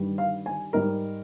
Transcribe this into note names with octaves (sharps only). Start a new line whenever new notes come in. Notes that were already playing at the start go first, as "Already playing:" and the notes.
Already playing: G2 D#3 G3
F5
G#5
G#2 G3 A#4